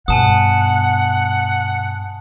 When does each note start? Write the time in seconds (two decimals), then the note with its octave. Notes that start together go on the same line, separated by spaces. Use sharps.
0.08 G2 B2 F#5 G#5 A5 D#6